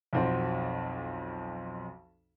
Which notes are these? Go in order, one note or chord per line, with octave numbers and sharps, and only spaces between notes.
B1 F2 C4 F#4